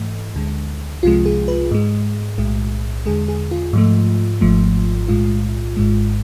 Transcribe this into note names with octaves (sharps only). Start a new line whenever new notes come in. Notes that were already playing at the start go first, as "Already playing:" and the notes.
Already playing: G#2 E3 A3
D2 D3 G#3
C2 C3 F3 G#3 F4
G#4
B4
G#2 G#3
B1 A2 G#3
E2 D3 G#3 G#4
G#4
F4
G#2 F3 A3
G#1 G#2 F3 A3
B1 A2 G#3 F4
G#1 G#2 G#3